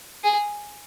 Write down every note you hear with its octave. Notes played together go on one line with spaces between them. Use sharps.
G#4